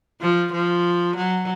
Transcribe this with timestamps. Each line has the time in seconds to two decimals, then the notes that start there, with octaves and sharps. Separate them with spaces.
0.21 F3
0.53 F3
1.16 F#3